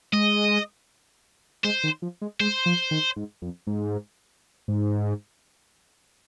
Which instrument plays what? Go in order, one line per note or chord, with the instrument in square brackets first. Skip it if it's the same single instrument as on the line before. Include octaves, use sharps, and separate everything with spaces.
[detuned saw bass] G#3 [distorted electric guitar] D#5
[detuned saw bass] G#3 [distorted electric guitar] C5
[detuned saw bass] D#3
F3
G#3
[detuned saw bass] G#3 [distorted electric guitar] C5
[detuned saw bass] F3
D#3
G#2
F2
G#2
G#2